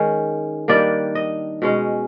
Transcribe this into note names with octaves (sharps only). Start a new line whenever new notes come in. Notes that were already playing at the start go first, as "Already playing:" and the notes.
Already playing: D#3 G#3 C#4
D#3 G3 A#3 D4 D5
D#5
B2 G#3 C#4